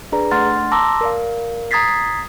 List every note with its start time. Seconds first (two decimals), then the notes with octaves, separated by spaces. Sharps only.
0.12 D4 G#4 B4 D5 A#5
0.31 A3 D4 F#5 C6 F6 A6
0.72 A5 A#5 C6 D6 E6 A#6
1.01 A#4 D5 F5
1.71 A#5 D#6 G#6 A6 B6 C7